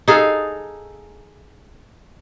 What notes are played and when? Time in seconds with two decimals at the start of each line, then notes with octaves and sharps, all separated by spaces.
0.08 D#4 G#4 A4 F5